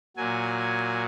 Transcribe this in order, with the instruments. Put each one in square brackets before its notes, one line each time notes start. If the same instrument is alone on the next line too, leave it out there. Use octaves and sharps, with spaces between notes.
[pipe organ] A#2 F#3 G#5